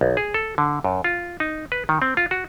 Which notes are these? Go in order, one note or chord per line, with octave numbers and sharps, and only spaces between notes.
B1
G#4
A4
D3
F#2
F4
D#4
B4
D#3
C4
F4
F#4